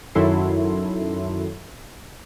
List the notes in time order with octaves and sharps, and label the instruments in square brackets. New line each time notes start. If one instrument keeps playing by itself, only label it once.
[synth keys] F#2 D#3 F#3 E4 A4 C6